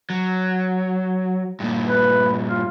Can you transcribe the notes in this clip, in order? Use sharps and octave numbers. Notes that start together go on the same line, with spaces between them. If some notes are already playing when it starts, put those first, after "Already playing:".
F#3
G2 A#2
B4
F4